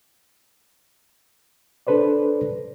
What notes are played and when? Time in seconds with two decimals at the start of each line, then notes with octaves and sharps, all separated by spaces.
1.87 D4 A4 B4 C5 D5